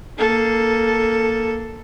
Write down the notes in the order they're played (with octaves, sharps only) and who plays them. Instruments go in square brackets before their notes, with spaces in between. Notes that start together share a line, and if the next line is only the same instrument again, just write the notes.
[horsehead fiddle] A#3 A4